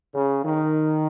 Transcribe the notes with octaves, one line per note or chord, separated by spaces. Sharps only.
C#3
D#3